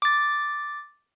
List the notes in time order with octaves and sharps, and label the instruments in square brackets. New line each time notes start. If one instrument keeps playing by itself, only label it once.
[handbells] D6 A6